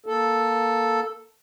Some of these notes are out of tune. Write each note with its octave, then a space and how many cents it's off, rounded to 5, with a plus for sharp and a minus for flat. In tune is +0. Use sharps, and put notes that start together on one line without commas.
A#3 +0 A4 +0